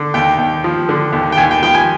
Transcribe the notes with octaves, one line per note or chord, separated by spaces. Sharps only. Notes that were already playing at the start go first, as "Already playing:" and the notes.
Already playing: D3
D#2 G5
D#2
F3
D3
D#2
G5
D#2 G#5
G5
F3 G5
G#5